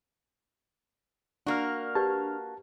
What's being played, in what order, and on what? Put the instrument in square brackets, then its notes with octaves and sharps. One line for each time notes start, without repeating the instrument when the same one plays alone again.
[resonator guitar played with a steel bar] A#3 F#4 [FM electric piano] D4 F6
[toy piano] G4 B4 D5 [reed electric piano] A5